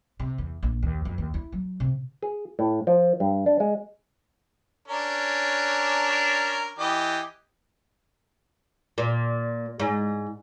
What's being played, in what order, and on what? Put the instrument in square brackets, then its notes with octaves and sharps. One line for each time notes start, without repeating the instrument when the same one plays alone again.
[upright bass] C3
E2
A#1
D#2
F2
D#2
E4
F#3
C3
[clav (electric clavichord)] G#4
A2
F3
G2
D4
G#3
[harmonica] C#4 D4 A#4
E3 G4 D#5
[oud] A#2
G#2